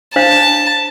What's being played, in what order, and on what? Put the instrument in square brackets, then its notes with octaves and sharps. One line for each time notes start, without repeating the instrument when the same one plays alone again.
[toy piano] D4 C5 F5 [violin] A5